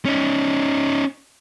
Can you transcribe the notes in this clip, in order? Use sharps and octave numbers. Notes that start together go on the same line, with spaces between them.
C#4 D#4